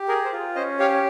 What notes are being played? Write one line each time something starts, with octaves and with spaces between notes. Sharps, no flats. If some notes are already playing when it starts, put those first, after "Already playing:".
Already playing: G4
G#4 A#4
C5
F4
C#4 C5 D#5
G4 C#5 F5